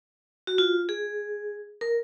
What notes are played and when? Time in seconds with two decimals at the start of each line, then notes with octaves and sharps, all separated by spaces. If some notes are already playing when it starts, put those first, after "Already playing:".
0.47 F#4
0.58 F4
0.89 G#4
1.81 A#4